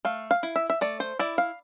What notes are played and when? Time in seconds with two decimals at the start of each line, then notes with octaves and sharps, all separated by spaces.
0.05 A3 F5
0.31 F5
0.43 E4
0.56 E5
0.70 E5
0.81 A3 D5
1.00 C5
1.19 E4 D5
1.38 F5